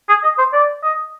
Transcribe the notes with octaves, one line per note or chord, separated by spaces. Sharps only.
G#4
D#5
C5
D5
D#5